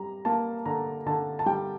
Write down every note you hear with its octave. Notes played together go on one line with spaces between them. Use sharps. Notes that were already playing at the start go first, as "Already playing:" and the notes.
Already playing: G3 A#5
A#3 A5
D3 A#5
D3 A5
A5
G3 G5